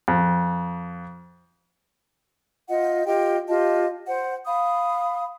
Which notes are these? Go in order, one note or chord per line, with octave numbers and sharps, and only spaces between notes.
F2
F4 D#5 F#5
F4 G4 D#5 G5
F4 G4 D#5 A5
C5 F#5
F5 B5 D#6